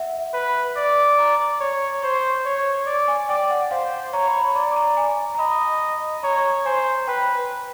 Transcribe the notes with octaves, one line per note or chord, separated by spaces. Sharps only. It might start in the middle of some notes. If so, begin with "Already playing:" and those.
Already playing: E5 F#5
B4
D5
A#5
C#5
C5 C#6
C#5
D5
G#5
D5 G5
F#5
C5 F5
C#5 A#5
B5
B5
D5 A#5
A#5
G#5
A#5
D#5 B5
C#5 A#5
C5 G#5
B4 G5